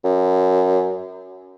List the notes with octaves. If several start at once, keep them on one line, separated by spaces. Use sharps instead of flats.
F#2